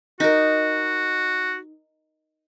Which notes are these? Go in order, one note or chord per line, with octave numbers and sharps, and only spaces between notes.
D#4 F#4 A#4